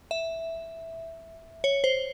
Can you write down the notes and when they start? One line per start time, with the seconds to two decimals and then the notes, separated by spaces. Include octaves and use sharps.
0.11 E5
1.64 C#5
1.84 C5